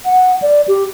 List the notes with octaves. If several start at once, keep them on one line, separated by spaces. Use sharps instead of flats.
F#5
D5
G4